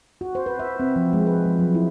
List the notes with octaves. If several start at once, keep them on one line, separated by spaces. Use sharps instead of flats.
F#4
C5
B4
E5
C4
F3
G#3
B4
F3
F#3
E4